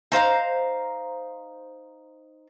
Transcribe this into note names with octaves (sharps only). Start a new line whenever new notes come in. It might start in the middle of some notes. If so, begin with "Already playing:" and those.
D#4 C5 F5 A#5